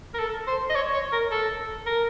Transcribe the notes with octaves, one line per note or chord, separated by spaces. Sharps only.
A#4
A4
C5
D#5
C#5
C#5
A#4
A4
A#4